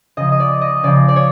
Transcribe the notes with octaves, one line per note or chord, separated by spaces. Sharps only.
C#3 F3 D#5
D#5
D5
D#5
C#3 F3 D5
D5
C#5